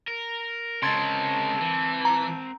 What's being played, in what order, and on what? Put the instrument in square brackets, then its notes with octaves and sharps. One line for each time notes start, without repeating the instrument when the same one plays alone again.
[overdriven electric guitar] A#4
[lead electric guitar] C#3 G#3 [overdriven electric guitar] C4 A#4 [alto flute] A5 [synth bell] C6 G#6 A6
[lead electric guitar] E3
[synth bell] A#5